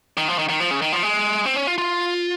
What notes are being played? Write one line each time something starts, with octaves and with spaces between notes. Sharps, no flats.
D#3
F3
D#3
D#3
F3
C#3
D#3
F3
G#3
C4
C#4
F4
F4